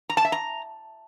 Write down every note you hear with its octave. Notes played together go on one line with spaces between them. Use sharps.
A#5
A5
E5
A#5